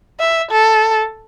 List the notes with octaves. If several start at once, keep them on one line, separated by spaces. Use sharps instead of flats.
E5
A4